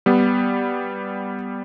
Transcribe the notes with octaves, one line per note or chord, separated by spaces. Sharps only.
G3 B3